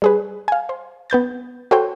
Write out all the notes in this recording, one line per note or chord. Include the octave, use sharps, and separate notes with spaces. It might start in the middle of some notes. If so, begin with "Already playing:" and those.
G3 G#4 B4
F5 G#5
C5
B3 B4 G6 A6
F#4 A4 C5 C#5 G5